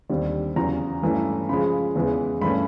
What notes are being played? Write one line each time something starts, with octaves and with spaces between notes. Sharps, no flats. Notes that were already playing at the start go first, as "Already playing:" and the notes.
D#2 D3 G3 C4
E2 C#3 F#3 A#5
G2 E3 A3 C#4 E4
C#3 F3 G#3 B5
E2 C#3 E3 G#3 B3
G2 E3 A3 C#4 B5